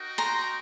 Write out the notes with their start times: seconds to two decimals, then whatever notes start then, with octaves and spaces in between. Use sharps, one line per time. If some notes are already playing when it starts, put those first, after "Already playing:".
Already playing: D#4 F#4 A#4 D#5 G5
0.18 A#5 C6